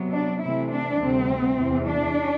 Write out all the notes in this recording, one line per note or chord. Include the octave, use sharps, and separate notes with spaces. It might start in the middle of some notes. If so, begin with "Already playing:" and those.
Already playing: C3 F#3 B3
D4
C3 E3 A3 C4 E4
D4
D2 C3 G3 C4
E2 C3 E3
D4